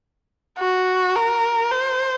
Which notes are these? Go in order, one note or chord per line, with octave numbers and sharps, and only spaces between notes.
F#4
A#4
C5